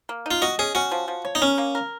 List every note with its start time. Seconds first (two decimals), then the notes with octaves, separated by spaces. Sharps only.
0.09 A#3
0.26 D#4 F4
0.42 F#4 D#5
0.59 C#4 G#4
0.75 C#4 F#4
0.92 F3
1.08 F3
1.25 C#5
1.35 D#4
1.42 C#4 A#4
1.58 A#3
1.75 A#4